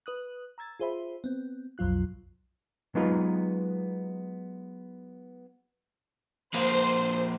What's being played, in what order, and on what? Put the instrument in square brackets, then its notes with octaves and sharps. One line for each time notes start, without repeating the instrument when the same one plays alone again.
[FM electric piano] B4 D#6 F#6
A#5 E6 G#6 A6
F4 G#4 C5 E5 B5
B3 C4
B1 F2 F#3 F4 F#6
[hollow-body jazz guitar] F#3 G#3 B3 D#4 F4 B4
[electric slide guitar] F3 A#3 B4 [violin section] C5